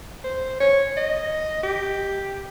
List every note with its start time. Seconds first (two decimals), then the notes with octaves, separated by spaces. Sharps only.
0.24 C5
0.60 C#5
0.97 D#5
1.63 G4